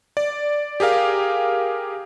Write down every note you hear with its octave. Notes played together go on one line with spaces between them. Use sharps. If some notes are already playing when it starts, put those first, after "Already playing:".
D5
G4 G#4 A#4 F5